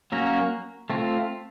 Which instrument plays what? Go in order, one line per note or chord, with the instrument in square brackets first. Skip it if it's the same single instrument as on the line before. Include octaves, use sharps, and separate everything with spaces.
[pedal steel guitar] F#3 A#3 C#4 F#4 A#4
A3 C4 F4